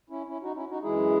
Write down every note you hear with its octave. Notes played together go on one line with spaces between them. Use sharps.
C#4 E4
C#4 E4
D#4 F#4
C#4 E4
D#4 F#4
F#2 E3 G#3 E4 G#4